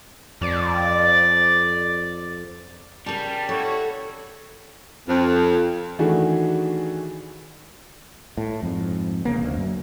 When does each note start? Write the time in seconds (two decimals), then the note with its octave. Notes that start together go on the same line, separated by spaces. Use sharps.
0.41 F2 D5
3.06 C#3 G3 A#4 A5
3.49 E4 F#4 A4 C#5
5.07 F2
5.99 D#3 E3 A3 D4 F#4 G#4
8.37 A2
8.62 F2 G#2
9.25 E1 C#3 A#3
9.43 D2
9.57 F#2